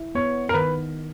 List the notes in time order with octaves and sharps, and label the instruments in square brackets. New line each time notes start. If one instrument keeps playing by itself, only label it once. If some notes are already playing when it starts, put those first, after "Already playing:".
Already playing: [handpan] E4
[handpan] B3 [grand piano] C#5
[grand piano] A#4
[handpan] D#3 [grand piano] B4